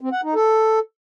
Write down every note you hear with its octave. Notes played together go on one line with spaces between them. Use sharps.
C4
F#5
D#4
A4